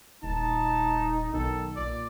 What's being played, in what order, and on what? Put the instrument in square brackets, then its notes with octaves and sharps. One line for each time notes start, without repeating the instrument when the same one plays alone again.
[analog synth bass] D#1 [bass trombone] D#4 [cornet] A5
[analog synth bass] B1 [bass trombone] D#3 [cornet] A4
[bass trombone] A#2 [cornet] D5